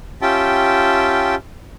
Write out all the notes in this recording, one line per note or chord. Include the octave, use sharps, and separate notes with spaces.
C#4 F4 G4 E5 G5 A5